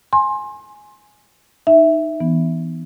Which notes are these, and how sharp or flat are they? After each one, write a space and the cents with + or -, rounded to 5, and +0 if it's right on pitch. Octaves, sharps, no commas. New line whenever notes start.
G#5 +5 C6 +20
D#4 -10 E5 +0
E3 +0 B3 +0